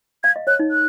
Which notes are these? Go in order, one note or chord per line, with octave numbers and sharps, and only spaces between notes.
F5 G#6
D#5
C#5 F#6
D#4
F#6